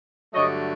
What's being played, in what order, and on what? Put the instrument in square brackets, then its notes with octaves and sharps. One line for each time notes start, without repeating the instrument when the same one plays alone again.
[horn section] G2 D3 F#3 A3 C#5 D#5